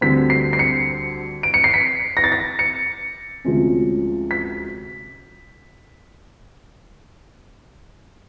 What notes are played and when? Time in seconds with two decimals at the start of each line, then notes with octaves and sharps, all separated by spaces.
0.01 D2 D3 G3 C4 B6
0.30 C7
0.53 C7
0.59 C#7
1.43 D7
1.54 C#7
1.64 C7
1.74 B6
2.17 A#6
2.24 A6
2.32 A#6
2.59 C#7
3.45 D2 C3 F3 G#3 C#4
4.31 B6